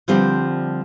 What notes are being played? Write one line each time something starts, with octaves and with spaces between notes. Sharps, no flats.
D3 F3 G3 C4